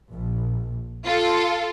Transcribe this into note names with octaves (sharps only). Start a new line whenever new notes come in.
A#1
F4 A4